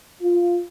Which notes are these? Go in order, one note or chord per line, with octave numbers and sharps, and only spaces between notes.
F4